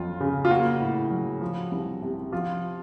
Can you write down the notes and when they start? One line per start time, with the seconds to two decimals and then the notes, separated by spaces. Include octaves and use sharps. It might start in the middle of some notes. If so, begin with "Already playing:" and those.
Already playing: F2 F#3 F4
0.21 C#3
0.45 F4
0.50 A#3 F#4
0.80 A2
1.11 F#3
1.41 F3
1.72 C2
2.02 C3
2.32 F3 F4